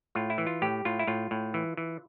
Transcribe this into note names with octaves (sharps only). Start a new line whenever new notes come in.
A2 F4
E4
E3
F4
A2 G4
A2 F4
E4
A2 F4
A2
E3
E3